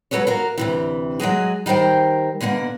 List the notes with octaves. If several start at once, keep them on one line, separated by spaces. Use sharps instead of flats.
D2 F#3 A3 A4 B4 C#5
F#4 A#4 F5
D2 C3 E3
F#3 G#3 F#4 G#4
D#3 G3 A#4 C5 G5
B2 D3 A#3 F#5